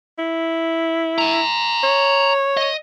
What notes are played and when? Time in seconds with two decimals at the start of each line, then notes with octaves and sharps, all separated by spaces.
0.19 E4
1.18 G#5 A#5
1.84 C#5
2.57 D#5